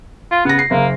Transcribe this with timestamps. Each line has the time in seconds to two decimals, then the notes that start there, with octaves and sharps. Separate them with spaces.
0.31 F4
0.45 C#3 B3 A#6
0.59 C7
0.71 F#1 A#3